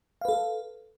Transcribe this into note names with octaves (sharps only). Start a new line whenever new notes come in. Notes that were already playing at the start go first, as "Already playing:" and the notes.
A4 B4 F5